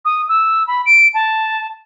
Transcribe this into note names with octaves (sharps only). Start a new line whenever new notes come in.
D#6
E6
B5
D7
A5